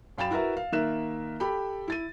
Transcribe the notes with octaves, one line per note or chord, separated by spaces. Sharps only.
F#2 F5 G5 B5 A6 E7
E4 F#4 A#4 B4 E5
F5
D#3 A#3 A#4 E5 F#6 E7
G4 A4 G5 B5
E4 A6 D#7